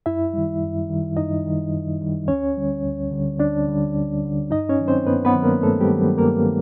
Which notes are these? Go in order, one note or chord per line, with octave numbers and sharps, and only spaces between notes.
F#2 E4 E5
D#3 G3
F#2
D#3 G3
F#2 D#4 D#5
D#3 G3
F#2
D#3 G3
D2 C#4 C#5
D3 G3
D2
D3 G3
D2 D4 D5
D3 G3
D2
D3 G3
G2 D#4 D#5
C#4 C#5
D#3 F#3
C4 C5
G2 B3 B4
B3 B4
D#3 F#3
A#3 A#4
G2 A3 A4
G3 G4
D#3 F#3
G2 A#3 A#4
D#3